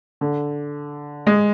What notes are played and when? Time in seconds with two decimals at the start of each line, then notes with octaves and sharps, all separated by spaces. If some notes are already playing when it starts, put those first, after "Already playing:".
0.21 D3
1.27 G#3